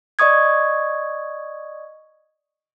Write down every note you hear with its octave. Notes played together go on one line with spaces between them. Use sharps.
D5 D#5 C#6 D#6 G#6